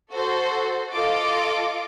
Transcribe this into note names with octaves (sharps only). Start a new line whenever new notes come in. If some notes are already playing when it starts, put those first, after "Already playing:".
F#4 A4 C5
F4 A4 D#5 D6